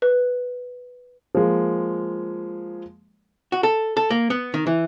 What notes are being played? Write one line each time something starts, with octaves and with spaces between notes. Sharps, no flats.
B4
F3 G#3 A#3
F#4
A4
A4
A#3
B3
D#3
E3